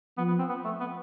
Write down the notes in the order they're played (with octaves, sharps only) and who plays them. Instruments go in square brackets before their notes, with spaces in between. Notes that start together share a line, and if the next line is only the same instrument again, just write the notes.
[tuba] F3 [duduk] B3
[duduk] B3
C4
B3
A3
B3